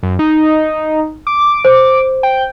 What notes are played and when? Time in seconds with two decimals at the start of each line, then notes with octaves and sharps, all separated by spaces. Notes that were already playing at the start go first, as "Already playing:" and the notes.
0.03 F#2
0.19 D#4
1.27 D6
1.65 C5
2.23 G5